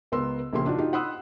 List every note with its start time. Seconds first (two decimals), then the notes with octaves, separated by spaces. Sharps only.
0.12 C#2 B3 A#4 C6 E6
0.53 A#1 C#3 A#3 G4 C6
0.66 D4 D#4 F4 F#4
0.78 D#4 F4 G4
0.93 F#5 B5 C6 D#6 E6 F#6